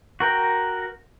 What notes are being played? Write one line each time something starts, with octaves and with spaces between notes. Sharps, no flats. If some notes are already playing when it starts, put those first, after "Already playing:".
F#4 A#4 G5